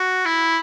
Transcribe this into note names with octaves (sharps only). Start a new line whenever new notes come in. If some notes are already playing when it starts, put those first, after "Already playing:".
Already playing: F#4
E4